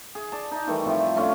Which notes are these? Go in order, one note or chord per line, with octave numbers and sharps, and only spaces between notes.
G#4
D5 A5
D#4
D#3 E3 G3 A3
A2 C3 F3 G3
A3 C#4 D4 F4